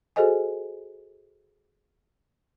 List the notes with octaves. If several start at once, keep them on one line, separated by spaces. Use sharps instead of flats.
F#4 G#4 A4 C5 D#5 G#5